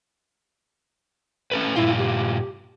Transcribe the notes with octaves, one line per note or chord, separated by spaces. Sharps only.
C#4 A4 B4
G2 A#2 E4 F4
G4